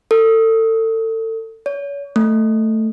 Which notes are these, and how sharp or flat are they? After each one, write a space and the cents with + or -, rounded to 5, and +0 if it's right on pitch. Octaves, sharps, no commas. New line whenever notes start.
A4 +30
C#5 +35
A3 +5